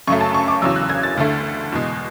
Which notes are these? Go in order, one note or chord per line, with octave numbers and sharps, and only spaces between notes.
F#2 C#3 F#3 A3 C#6
A5
C#6
D6
E2 C#3 F#3 E6
F#6
G#6
A6
D2 D3 A3
E2 B2 G#3